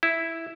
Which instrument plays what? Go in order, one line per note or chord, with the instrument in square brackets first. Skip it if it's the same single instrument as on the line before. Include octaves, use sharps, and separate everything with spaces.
[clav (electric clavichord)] E4